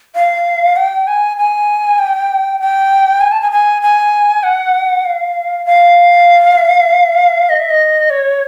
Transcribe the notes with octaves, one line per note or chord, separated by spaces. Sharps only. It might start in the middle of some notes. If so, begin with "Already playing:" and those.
F5
G5
G#5
G#5
G5
G5
G#5
A5
G#5
G#5
G#5
F#5
F5
F5
D#5
E5
D#5
C#5